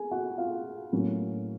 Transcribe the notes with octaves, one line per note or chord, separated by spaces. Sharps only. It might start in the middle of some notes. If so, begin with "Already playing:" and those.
Already playing: G#4 G#5
F#4 F#5
F4 F5
A2 F#3 A#3 C#4